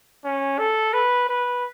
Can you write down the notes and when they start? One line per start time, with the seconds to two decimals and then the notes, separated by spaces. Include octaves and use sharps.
0.24 C#4
0.59 A4
0.93 B4
1.29 B4